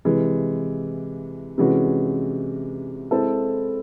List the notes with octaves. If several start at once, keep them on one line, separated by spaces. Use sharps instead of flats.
C3 E3 G#3
C3 E3 G#3 C#4 F#4
G#3 C4 E4 A4